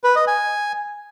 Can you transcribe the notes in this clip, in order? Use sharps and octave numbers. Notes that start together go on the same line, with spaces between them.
B4
D#5
G#5